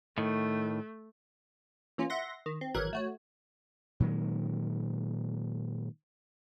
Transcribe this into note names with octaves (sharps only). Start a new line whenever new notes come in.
A2 D#3 A3
E3 A#3 C#4 F4
E5 F#5 C6 A#6
D#3
C4
G#1 E3 F#3 A#4 F#6 G#6
A3 F#4 C#5
A#2 D#3 F#3 G#3